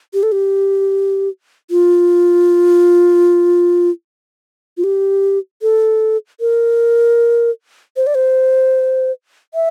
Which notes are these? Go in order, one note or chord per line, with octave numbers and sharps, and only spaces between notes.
G4
A4
G4
F4
F4
G4
A4
A#4
C5
D5
C5
E5